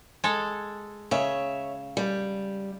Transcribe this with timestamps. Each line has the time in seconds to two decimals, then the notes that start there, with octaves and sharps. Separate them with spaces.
0.24 G#3 A4
1.11 C#3 C#5 E5
1.97 G3